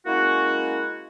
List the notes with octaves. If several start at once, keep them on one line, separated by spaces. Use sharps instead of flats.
G#3 A#3 C#4 E4 F#4